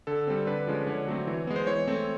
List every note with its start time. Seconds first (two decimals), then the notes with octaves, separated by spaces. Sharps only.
0.07 D3 A4
0.27 G3 C4
0.47 D3 B4
0.67 F3 G#3 C#4
0.87 D3 C#5
1.07 F#3 A3 C4
1.27 E3
1.47 G#3 B3
1.56 C5
1.67 E3 C#5
1.87 A3 C4